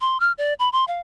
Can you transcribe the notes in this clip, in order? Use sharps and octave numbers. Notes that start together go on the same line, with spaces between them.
C6
F6
D5
B5
C6
F5